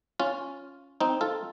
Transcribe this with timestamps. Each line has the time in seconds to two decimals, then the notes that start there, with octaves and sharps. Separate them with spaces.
0.19 C#4 F4
1.01 C4 D#4
1.21 F4 A4